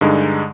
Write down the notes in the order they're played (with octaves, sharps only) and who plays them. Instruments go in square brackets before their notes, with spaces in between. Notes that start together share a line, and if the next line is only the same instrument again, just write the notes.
[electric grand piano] G2 D3 G#3 D#4